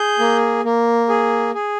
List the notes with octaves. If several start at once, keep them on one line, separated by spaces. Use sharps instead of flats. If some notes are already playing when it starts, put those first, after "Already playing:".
Already playing: G#4 G6
A#3
A#3
G#4
G#4